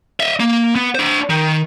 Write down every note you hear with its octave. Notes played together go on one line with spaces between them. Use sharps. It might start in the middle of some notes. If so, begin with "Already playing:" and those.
D#5 E5
A#3
B3
D4 C5
D#3